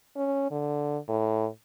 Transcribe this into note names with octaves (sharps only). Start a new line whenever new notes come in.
C#4
D3
A2